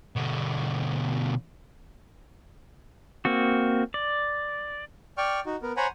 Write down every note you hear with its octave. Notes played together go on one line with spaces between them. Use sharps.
B2 D3
A#3 C4 F#4
D5
D5 G5 C#6 F6
D#4 F#4
B3 A#4
C5 C#5 F#5 G#5 A#5 B5